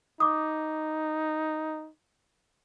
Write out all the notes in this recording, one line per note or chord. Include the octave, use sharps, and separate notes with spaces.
D#4 D6 D#6